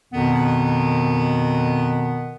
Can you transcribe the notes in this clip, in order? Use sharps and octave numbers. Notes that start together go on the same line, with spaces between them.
F2 B2 D#3 B3